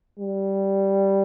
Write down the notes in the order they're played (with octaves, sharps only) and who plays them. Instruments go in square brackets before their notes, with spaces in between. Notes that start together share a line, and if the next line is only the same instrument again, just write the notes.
[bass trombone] G3